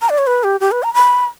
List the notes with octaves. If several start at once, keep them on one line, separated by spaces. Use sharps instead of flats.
A#5
D5
C#5
B4
G4
G4
B4
A#5
B5